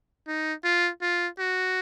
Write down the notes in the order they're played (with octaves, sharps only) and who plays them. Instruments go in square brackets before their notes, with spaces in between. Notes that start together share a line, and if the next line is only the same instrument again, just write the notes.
[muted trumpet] D#4
F4
F4
F#4